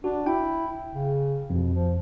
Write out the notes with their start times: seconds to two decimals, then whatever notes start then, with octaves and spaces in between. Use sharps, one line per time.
0.04 D4 F#4
0.26 E4 G5
0.94 C#3
1.50 F2 B2
1.73 F3